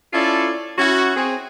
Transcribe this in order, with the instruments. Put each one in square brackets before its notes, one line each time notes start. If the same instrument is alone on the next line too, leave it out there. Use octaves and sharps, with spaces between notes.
[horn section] C#4 E4 F4 A4 D5
C#4 E4 F#4
C4 G#4